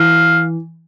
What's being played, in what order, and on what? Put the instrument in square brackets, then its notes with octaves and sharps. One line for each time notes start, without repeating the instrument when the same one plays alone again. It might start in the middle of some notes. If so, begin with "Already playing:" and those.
Already playing: [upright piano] E3 [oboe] F5